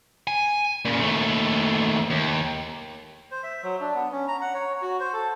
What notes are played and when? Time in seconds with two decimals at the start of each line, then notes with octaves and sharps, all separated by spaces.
0.27 G#5
0.85 A#2 C#3
1.00 D#2 A3
2.10 D#2
3.31 C5
3.43 E5
3.63 F#3
3.80 D4
3.95 B3
4.12 C#4
4.28 A#5
4.41 F#5
4.54 C#5
4.82 F#4
5.00 C5
5.13 A4